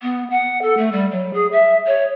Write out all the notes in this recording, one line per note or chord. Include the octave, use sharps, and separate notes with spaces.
B3
F#5
A4
A3
G3
F#3
G#4
E5
C#5